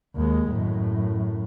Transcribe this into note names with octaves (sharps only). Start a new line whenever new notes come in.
D#2 G#3
F#2 A2